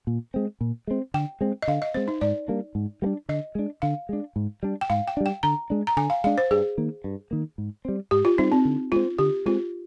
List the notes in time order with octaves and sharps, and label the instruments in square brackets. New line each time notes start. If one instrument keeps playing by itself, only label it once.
[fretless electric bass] A#2
G#3 C4
A#2
G#3 C4
[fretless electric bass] D3 [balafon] G5
[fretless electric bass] G#3 C4
[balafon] D#5
[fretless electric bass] D3 [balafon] F5
[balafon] D#5
[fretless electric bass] G#3 C4 [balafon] C5
[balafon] D#4
[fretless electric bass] G#2 [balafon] D5
[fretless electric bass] G3 A#3 D4
G#2
G3 A#3
D4
[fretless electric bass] D3 [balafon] D#5
[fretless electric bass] G#3 D4
[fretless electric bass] D3 [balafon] F5
[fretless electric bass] G#3 D4
G#2
G3 D4
[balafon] G5
[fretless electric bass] G#2 [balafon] F5
[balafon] G5
[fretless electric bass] G3 D4
[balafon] G5
[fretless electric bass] D3 [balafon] A#5
[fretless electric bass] G#3 D4
[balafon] A#5
[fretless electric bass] D3 [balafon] G#5
[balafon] F5
[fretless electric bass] G#3 D4 [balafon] F5
[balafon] C5
[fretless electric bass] G2 [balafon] G#4
[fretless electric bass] D#3 A#3
G2
D#3 A#3
G#2
G3 C4
[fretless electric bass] G#2 [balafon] G4
[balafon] F4
[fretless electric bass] G3 C4 [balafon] D#4
[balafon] C4
[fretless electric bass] D3
[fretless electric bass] G#3 C4 [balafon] F4
[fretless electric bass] D3 [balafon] G4
[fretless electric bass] G#3 C4 [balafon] F4